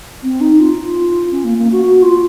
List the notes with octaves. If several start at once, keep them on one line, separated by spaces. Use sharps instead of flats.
C4
D#4
F4
F4
C#4
A#3
A#3
F#4
F#4
F4